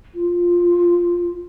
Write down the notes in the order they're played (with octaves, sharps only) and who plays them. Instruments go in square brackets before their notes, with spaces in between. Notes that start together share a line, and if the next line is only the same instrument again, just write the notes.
[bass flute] F4